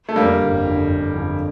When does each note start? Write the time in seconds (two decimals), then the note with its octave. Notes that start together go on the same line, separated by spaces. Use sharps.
0.09 A3
0.16 F2 D3 G3 A#3
0.41 G1
0.65 F2 D3
0.89 G1
1.14 F2 D3